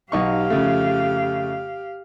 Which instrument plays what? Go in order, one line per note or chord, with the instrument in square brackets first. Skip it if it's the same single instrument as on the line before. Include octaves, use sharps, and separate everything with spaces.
[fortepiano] B1 D#4 C#6 [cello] G4 F5
[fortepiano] F2 C#3 A3